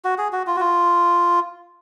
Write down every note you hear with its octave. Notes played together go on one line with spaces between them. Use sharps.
F#4
G#4
F#4
F4
F#4
F4